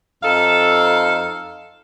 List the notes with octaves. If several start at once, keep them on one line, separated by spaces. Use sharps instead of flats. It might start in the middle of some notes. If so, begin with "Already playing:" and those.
F2 D#4 A4 F5